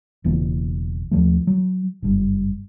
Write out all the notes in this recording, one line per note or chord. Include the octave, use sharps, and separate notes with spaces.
E1 C#3 E3 A#3
D#2 F3 A3
F#3
F#1 G2